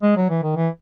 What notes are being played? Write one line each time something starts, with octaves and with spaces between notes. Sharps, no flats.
G#3
F#3
E3
D#3
E3